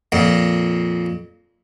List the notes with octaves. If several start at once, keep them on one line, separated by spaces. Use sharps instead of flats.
F2 A#2